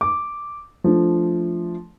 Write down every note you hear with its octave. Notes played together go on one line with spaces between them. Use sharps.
D6
F3 A3 D4